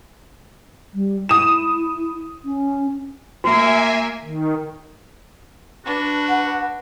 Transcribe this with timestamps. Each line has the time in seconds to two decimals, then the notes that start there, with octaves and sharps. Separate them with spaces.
0.94 G3
1.29 E4 D#6 E7
2.45 C#4
3.44 A#3 F#4 E5 G#5
4.24 D#3
5.86 D4 F#4 B4
6.29 F#5